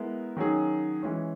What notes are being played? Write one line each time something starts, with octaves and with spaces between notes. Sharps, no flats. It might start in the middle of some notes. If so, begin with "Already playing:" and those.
Already playing: G#3 B3 E4 A#4
D#3 F#3 C#4 G#4
E3 G#3 C#4